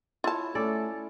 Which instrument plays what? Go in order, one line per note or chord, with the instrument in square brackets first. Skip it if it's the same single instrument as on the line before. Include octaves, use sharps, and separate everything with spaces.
[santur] E4 C#5 [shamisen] F4 A5
[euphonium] A3 [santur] C#4 [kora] A4 D5